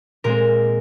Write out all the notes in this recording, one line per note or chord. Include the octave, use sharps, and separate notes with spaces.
A#2 G#3 C4 A#4